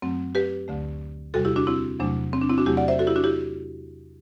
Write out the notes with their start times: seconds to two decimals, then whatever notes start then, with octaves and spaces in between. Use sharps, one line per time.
0.02 F#2 F#3 A3 C4
0.35 G4 B4
0.68 D2 D3 A3
1.34 E2 C3 G3 F#4 A4
1.45 E4 G4
1.56 D4 F#4
1.67 C4 E4
2.00 E2 C3 F#3 A3 D4
2.33 C4
2.41 D4
2.50 C4 E4
2.58 D4 F#4
2.66 E2 C3 F#3 A3 E4 G4
2.77 D5 F#5
2.88 C5 E5
2.99 F#4 A4
3.07 E4 G4
3.16 D4 F#4
3.24 E4 G4